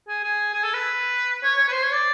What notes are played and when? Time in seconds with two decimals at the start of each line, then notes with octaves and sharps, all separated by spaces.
0.08 G#4
0.24 G#4
0.54 G#4
0.64 A4
0.74 B4
1.44 C#5
1.58 C#5
1.68 B4
1.73 C5
1.83 C#5
1.93 D5